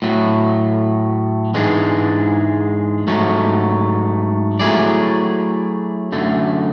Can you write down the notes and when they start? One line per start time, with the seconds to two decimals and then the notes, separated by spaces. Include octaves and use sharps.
0.02 A2 F#3 A3
1.54 G#2 E3 G#3 D4
3.07 G#2 F#3 A3
4.59 F#3 A3 E4 G#4 D5
6.12 F#2 D3 A3